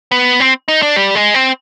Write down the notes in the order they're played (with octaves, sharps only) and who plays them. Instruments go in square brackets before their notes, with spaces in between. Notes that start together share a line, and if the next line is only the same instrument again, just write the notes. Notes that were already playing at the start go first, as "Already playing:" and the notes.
[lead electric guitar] B3
C4
D#4
D4
G3
G#3
C4